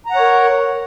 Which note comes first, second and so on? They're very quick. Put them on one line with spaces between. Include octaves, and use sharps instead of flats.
A#5 F#5 C#5 A#4